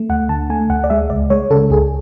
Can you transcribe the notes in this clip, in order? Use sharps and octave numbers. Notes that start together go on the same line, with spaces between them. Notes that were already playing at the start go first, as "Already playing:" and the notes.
Already playing: A3
D2 F#5
D3 A5
A3 G#5
D2 F#5
D5
G#3 E5
C#2 D5
G#3 C#5
C#3 A4
C#2 G#4